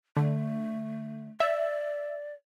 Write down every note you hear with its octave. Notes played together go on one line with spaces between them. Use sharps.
D3 A3
D5 E5